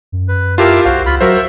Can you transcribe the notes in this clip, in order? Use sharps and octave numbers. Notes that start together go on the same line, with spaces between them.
F#2
B4
E4 F4 G4 A#4 F5 A5
B1 F#4 C5 F5
C#2 F4 B5
F#3 F#4 A#4 C5 E5